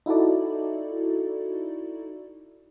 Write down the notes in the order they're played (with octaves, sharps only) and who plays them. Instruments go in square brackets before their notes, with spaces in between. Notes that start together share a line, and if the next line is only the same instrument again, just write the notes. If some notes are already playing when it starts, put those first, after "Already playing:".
[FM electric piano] D#4 E4 F#4 A4 D5